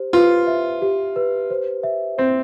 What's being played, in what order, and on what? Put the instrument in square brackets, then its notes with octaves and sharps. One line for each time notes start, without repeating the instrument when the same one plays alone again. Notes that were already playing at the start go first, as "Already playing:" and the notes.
Already playing: [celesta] G4 C5
[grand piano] F4 [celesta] B4
[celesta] E5
G4
B4
C5
E5
[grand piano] C4 [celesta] C5